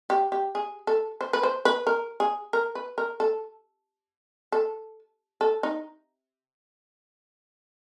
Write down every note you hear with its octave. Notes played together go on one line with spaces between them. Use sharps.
G4
G4
G#4
A4
C5
B4
C5
B4
A#4
G#4
A#4
B4
A#4
A4
A4
A4
D#4